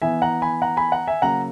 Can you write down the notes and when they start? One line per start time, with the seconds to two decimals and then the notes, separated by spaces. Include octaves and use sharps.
0.02 E3 B3 E5 G#5
0.22 F#5 A#5
0.42 G#5 B5
0.62 F#5 A#5
0.77 G#5 B5
0.92 F#5 A#5
1.08 E5 G#5
1.22 C#3 F#3 A#3 F#5 A#5